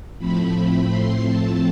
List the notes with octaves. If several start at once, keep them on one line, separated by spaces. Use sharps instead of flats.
A2 F3 A3 C4 B5
C6
A5